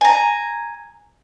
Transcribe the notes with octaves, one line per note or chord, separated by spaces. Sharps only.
G#5 A#5